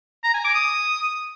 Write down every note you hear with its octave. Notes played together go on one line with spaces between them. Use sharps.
A#5
G#5
D6
D#6